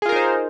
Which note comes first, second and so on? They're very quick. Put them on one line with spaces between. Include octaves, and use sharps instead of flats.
G#4 F4 A#4 D#4 C5